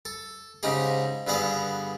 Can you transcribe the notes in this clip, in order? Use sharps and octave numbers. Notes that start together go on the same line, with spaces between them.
A4
G#2 C#3 C#4 D#4 G4 G#4
G2 D3 B3 G#4 F5 F#5